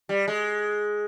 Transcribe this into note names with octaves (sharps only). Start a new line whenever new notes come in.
G3
G#3